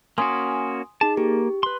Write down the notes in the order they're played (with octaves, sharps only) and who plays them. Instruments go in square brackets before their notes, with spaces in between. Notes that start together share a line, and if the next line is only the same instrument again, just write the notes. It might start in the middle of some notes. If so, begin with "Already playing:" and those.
[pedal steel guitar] A#3 C#4 F#4 [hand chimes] G#5 C6 D#6
[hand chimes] D#4 G#4 [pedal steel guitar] A5
[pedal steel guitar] A#3 [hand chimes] G4
[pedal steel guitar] B4 C6